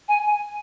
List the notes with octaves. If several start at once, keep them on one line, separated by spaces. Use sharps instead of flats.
G#5